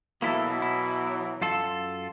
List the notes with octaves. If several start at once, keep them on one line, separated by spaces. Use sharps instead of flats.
B2 E3 F#3 A#3 E4 A4
E4
F#2 F4 A4